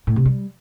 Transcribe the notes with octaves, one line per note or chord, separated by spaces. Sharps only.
A2
C3
G3